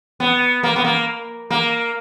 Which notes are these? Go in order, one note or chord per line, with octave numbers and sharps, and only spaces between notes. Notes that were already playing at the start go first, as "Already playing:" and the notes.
B3
A#3
B3
A#3
A#3